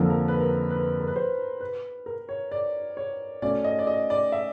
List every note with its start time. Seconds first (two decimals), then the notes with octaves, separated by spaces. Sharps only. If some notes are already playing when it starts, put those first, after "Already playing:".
Already playing: F2 D3 F3 A#3
0.10 A#4
0.28 B4
0.40 A#4
0.71 B4
1.00 A#4
1.07 B4
1.16 C5
1.61 B4
2.06 A#4
2.29 C#5
2.52 D5
2.97 C#5
3.42 A3 C#4 F#4 D5
3.64 D#5
3.79 D5
3.87 D#5
4.10 D5
4.32 E5